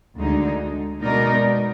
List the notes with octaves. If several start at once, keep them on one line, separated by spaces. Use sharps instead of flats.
D2 D3 G#3 D#4
B2 G#3 D#4 A#4 D5